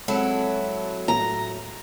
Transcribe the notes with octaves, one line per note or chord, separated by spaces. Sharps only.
F#3 G#3 C4 E4 A4
A2 A#5